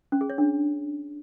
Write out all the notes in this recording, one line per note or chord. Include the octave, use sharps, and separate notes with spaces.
C#4
G#4
C#5
D4